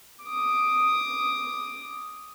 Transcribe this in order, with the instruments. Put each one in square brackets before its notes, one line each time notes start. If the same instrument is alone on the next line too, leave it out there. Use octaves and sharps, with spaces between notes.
[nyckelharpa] D6 D#6